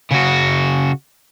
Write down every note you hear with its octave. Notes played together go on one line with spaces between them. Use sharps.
C#3 F#4